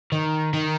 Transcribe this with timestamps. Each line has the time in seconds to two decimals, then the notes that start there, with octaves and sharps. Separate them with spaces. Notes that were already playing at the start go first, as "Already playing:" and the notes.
0.12 D#3
0.53 D#3